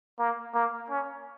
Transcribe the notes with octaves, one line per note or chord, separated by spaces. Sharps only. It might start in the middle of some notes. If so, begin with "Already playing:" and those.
A#3
A#3
C#4